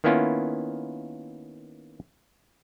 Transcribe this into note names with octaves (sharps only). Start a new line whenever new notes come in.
D#3 A#3 B3 C#4 E4 F4